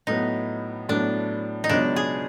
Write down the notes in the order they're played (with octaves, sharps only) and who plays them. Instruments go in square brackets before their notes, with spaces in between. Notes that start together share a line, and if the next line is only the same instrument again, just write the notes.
[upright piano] A2 F#3 B3 [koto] D#4
[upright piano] A2 F#3 B3 [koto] D4
[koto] D#4
[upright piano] C#2 B2 F#3 B3 [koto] D4
[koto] G#4